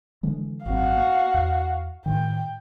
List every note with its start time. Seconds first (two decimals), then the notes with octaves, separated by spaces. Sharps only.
0.23 D3 E3 G#3
0.66 G#1 F#2 C4 F#4 F5
0.97 B3
1.34 E2
2.06 A2 D#3 G5